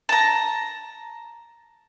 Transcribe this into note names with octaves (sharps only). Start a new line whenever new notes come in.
A5 A#5